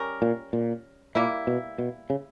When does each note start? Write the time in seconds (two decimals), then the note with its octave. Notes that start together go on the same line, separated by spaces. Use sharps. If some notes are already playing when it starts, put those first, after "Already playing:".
Already playing: G3 C#4 G4 A#4
0.22 A#2
0.53 A#2
1.15 A#2 G3 A#3 E4
1.47 B2
1.78 B2
2.10 C#3